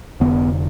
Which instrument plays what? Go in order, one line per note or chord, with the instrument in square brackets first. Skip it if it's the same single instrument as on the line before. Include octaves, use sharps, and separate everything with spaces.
[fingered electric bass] F1 F2 D3 B3